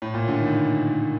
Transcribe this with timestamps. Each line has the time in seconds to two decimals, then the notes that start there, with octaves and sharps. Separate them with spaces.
0.02 A2
0.14 A#2
0.28 D3
0.40 D#3